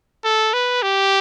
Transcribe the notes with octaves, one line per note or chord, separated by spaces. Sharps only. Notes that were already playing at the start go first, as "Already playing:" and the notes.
A4
B4
G4